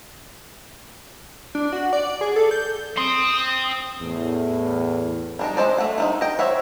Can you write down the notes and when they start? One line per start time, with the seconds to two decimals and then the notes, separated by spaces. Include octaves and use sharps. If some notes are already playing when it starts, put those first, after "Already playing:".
1.55 D4
1.73 F#4
1.93 D5
2.21 G#4
2.36 A4
2.51 G6
2.97 C4 C6 D#6
4.01 E2 A2
5.39 G3 D4 D#4
5.57 G#3 C5 D5
5.78 A3 F#5
5.98 D#4 F4 F#5
6.21 D#5 G5
6.39 C5 C#5 E5 F#5